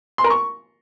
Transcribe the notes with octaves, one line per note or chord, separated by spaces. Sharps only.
C6
A#4
C#6